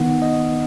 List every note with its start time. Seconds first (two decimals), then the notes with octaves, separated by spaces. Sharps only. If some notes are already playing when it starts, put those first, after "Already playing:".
Already playing: D#3 B3 D#4 F#5
0.22 D#5